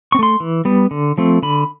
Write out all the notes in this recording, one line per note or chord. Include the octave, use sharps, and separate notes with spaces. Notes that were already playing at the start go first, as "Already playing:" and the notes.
C4 C#6
A3 C6
E3
G3 B3
D3
F3 A3 C4
D3 B5